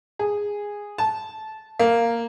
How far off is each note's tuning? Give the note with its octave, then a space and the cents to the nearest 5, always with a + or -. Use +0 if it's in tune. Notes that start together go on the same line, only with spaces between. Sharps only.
G#4 -10
A5 -15
A#3 -5